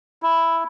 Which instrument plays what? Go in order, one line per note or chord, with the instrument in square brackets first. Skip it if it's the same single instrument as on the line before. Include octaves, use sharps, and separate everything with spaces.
[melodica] E4